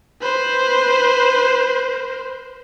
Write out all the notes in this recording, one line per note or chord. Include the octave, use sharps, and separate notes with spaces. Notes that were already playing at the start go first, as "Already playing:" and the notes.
B4 C5